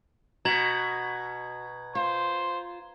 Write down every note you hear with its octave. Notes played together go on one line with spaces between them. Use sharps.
B2 F#4 A#5 G#6 F#7
F4 C5